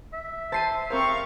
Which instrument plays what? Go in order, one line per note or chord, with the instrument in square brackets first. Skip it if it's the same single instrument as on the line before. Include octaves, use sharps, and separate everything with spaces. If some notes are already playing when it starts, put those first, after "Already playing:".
[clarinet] E5
[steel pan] C5 [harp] A5 C7 D#7
[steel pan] C4 A#4 C5 [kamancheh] F5 C#6